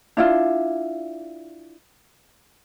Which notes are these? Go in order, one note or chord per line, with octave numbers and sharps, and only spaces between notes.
D4 E4 F4